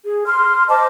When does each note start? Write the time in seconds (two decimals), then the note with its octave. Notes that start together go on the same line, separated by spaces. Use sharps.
0.05 G#4
0.26 C6 F6
0.69 C5 D#5 A5 D6